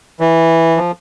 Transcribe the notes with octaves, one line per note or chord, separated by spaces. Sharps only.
E3
F3